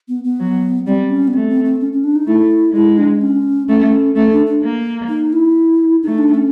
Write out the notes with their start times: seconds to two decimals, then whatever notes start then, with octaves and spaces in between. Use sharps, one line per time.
0.08 B3
0.24 B3
0.40 F#3
0.86 G3 C4
1.10 C#4
1.28 B3
1.33 A3 C4
1.49 C4
1.65 C4
1.80 C#4
1.93 C#4
2.04 D4
2.16 D#4
2.27 A3 E4
2.74 G#3 E4
2.98 D4
3.21 C#4
3.68 A3 C#4
4.15 A3 C#4
4.31 D4
4.46 D4
4.62 A#3
5.09 D#4
5.33 E4
6.03 A3 D#4
6.18 D4
6.34 C#4